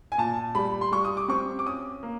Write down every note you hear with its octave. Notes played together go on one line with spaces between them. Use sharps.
G#5
A#2 A5
G3 B5
C6
G3 C#6
D#6
D6
C4 C#6
D6
C#4 D#6
A#3